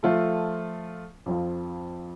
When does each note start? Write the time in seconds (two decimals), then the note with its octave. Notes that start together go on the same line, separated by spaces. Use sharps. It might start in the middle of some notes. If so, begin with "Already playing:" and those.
0.03 F3 A3 F4 A4
1.26 F2 F3 C4 F4